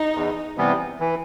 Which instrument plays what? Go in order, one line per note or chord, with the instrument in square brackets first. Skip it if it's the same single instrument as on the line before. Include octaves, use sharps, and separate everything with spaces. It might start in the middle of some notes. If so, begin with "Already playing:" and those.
Already playing: [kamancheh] D#4
[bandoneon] E2
C3 E3 G3 B3
E3